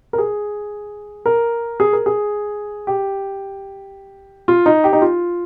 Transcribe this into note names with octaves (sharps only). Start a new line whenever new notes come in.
A#4
G#4
A#4
G#4
A#4
G#4
G4
F4
D#4
G4
D#4
F4